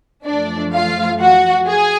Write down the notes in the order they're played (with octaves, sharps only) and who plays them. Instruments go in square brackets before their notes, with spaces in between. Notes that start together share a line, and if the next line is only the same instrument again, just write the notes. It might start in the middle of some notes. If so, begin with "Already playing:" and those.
[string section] F#2 F3 A3 D4 D5
F4 F5
F#4 F#5
G#4 G#5